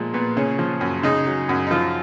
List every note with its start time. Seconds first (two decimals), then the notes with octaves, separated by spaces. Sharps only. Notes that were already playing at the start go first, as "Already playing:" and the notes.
Already playing: A#2 F3 G#3
0.14 A#2 B3
0.37 C#3 C#4
0.59 F3
0.81 F#2
1.03 C#3 D#4
1.26 F#3
1.49 F#2
1.66 D#4
1.71 F3 F4